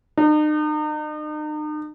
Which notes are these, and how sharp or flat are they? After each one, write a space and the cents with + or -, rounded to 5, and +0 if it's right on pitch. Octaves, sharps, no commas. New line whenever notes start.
D#4 -40